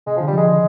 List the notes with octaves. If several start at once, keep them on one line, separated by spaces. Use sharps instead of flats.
C3 G#3
D3 F3
G3
F3 G#3
D#3 G#3